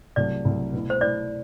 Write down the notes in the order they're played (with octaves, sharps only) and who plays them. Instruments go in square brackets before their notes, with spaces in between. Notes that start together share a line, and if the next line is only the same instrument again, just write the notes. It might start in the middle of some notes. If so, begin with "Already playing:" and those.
[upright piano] C2 C3 F#3 A3 [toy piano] D5
[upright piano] C2 C3 F#3 A3
B2 A3 E4
[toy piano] C5
[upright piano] B2 A3 E4 [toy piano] D5